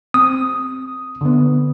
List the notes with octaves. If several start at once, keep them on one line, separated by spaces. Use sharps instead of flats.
C4 D#6
D3 B3